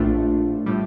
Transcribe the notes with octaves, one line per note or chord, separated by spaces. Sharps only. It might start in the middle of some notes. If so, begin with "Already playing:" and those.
Already playing: A#1 A2 A3 D4 F4
A2 G3